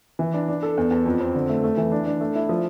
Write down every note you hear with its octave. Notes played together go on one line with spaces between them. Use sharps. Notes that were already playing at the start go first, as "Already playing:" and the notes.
E3
D4
D4
A4
E2
E2
F2
C4
D3
A3
A3
E3
D4
D4
A3
E4
F3